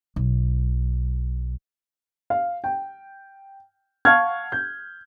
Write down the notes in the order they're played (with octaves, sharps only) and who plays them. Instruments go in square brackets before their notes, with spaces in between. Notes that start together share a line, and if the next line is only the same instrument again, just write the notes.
[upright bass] B1
[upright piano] F5
G5
F5 F#5 A5 C#6 F6 G#6
G6